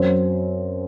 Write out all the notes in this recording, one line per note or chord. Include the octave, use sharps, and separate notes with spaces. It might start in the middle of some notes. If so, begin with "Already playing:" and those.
Already playing: F#2 F#3 C4